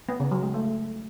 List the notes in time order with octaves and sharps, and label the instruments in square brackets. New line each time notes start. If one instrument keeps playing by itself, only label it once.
[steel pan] B3
C#3
F#3
G#3
A3